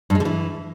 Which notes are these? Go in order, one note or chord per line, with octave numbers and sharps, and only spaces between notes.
G2
G#3
D3
E3